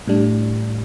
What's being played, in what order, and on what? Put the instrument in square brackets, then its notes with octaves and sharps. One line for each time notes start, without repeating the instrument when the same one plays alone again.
[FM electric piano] A2 G3 D4